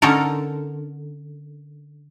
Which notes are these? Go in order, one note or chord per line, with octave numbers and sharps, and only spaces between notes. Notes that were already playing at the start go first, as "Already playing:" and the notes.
D3 C#4 D#4 A4 A#4